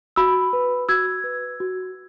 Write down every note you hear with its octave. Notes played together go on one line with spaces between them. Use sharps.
F#4 B5 E6
B4
F#4 E6 G#6
B4
F#4